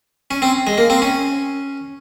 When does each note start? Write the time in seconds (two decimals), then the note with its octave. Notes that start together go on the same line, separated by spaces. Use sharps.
0.31 C#4
0.42 C4
0.67 G#3
0.78 A#3
0.90 C4
1.02 C#4